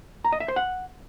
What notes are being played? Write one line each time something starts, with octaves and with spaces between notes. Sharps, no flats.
A#5
D#5
E5
C5
F#5